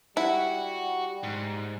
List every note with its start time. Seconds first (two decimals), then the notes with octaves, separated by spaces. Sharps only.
0.17 G3 E4 F#4
1.23 G#2